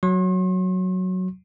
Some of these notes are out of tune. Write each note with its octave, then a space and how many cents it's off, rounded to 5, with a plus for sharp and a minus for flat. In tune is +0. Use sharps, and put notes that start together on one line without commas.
F#3 +0 C6 +45